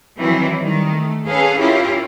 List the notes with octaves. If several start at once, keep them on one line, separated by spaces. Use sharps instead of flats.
D#3 E3 F#3 C4 E4
D#3 G3
A3
C#4 G#4 A4 B4 F5
C#4 E4 F4 G4 A#4